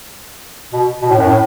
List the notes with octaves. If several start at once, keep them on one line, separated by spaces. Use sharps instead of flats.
B2
B2
A2
F#2
A2